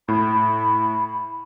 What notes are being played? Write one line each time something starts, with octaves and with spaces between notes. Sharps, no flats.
A2 B5